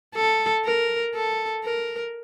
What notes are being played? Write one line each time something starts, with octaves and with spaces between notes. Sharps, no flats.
A4
A#4
A4
A#4